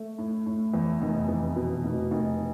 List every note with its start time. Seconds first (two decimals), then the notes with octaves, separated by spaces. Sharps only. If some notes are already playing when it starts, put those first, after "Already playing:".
Already playing: A3
0.18 A2
0.46 A2
0.74 E2
1.02 F1
1.28 E2
1.56 B2
1.84 F1
2.11 F1